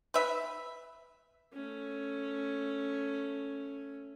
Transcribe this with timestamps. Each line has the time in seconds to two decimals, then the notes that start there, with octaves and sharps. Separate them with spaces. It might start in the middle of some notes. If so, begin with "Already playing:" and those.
0.14 B4 E5
1.53 A3 C#4